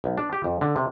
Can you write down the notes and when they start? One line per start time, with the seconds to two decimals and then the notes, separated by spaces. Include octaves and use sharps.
0.04 B1
0.18 D4
0.33 G4
0.44 F2
0.61 D3
0.76 C3